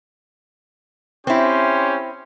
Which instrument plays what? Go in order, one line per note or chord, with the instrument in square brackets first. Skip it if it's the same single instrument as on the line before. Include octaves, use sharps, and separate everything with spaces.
[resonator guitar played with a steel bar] C4 E4 [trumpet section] C#4 G4 C6